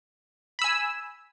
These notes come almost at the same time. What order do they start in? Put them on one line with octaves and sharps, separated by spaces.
B5 E6 G#5